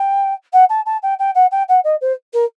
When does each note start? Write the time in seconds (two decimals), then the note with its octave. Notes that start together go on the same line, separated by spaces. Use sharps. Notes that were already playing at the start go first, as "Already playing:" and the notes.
Already playing: G5
0.53 F#5
0.69 A5
0.86 A5
1.02 G5
1.19 G5
1.34 F#5
1.51 G5
1.68 F#5
1.84 D#5
2.01 C5
2.33 A#4